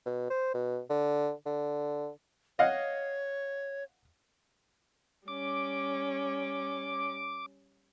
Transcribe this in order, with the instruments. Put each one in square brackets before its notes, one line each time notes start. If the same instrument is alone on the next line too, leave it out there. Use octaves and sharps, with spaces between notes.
[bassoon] B2
C5
B2
D3
D3
[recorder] C#5 [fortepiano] D#5 F5 F#5
[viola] G3 C#4 [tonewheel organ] D6